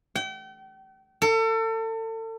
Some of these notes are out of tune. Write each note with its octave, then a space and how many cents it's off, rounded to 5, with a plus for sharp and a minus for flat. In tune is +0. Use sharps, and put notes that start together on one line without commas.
G5 -40
A4 +35